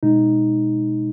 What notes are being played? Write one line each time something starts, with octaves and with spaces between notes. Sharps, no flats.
B2 G#3 D#4